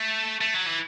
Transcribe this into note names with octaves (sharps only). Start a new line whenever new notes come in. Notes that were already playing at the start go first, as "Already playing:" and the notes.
Already playing: A3
A3
F#3
E3